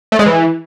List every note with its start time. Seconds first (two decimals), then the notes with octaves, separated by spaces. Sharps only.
0.12 A3
0.19 G#3
0.26 E3